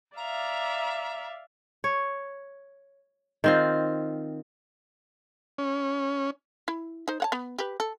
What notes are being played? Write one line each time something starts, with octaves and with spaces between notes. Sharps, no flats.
D5 E5 F5 A#5
C#5
D#3 C4 F4
C#4
E4
D#4 C5
C#5 F#5 A5
B3
G4 B4
A4